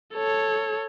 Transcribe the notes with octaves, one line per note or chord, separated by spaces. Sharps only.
A4 C#5